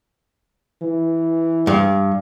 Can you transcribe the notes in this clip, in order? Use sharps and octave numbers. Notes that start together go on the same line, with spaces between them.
E3
G2